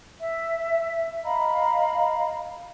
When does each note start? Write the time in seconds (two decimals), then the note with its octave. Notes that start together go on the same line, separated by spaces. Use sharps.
0.19 E5
1.24 D#5 F5 A#5 B5